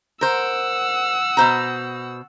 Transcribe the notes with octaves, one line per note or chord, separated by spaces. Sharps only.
A#4 C5 F#5 E6
B2 C5 A#5